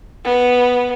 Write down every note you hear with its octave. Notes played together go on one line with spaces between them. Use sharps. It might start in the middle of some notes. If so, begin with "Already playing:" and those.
B3